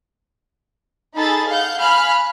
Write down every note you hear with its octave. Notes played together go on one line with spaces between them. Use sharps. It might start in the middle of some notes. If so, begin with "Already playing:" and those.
D#4 G#4 A4 B5 A6
F5 F#5 G6
F5 G#5 B5 F6 F#6